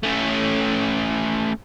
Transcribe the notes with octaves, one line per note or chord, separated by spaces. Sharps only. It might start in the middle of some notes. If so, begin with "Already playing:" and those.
A3 C#4